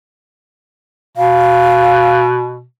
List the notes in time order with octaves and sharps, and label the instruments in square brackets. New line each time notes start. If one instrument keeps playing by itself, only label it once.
[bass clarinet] B2 [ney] F5